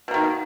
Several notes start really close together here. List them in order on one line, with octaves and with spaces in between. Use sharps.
B2 A#3 D#3